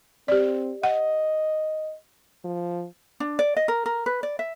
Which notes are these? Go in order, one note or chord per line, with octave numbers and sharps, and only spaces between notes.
C4 G4 D5
D#5 F#5
F3
D4
D5
D#5
A#4
A#4
B4
D5
E5